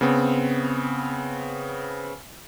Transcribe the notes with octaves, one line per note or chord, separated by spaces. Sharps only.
C#3 B3 C4